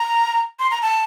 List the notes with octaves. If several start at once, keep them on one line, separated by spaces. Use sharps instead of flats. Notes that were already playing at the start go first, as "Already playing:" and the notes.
Already playing: A#5
C6
A#5
A5